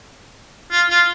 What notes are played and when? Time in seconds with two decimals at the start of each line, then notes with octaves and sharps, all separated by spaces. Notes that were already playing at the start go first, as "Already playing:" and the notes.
0.71 F4
0.90 F4